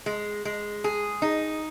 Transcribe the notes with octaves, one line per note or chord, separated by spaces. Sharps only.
G#3
G#3
G#4
D#4